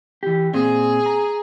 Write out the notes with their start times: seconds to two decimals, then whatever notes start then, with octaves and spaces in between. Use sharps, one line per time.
0.23 E3 G4
0.53 A#2 C4 G#4
1.06 A#5